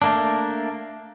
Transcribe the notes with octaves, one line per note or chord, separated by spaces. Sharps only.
A3 A#3 D4